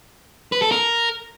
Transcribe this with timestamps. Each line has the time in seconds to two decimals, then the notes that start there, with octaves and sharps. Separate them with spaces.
0.52 B4
0.62 A4
0.72 A#4